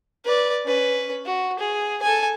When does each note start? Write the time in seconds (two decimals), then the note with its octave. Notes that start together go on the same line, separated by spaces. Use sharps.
0.25 B4 D5
0.65 C#4 B4
1.25 F#4
1.59 G#4
2.02 A4 G#5